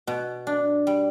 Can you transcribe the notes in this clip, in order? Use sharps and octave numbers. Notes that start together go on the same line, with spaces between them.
B2
D4
G3